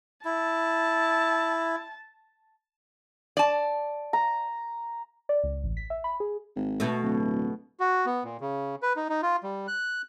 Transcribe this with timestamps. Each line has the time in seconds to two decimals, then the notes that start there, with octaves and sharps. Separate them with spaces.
0.25 E4 A5
3.37 D5 A5
4.13 A#5
5.29 D5
5.44 C#2
5.64 A1
5.77 B6
5.90 E5
6.04 B5
6.20 G#4
6.56 G#1
6.80 B2 A3
7.03 D1
7.80 F#4
8.06 B3
8.24 A#2
8.41 C#3
8.82 B4
8.96 D#4
9.09 D#4
9.22 F4
9.43 G3
9.68 F#6